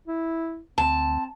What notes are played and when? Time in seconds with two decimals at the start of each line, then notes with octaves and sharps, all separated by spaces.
0.08 E4
0.78 D2 C4 A5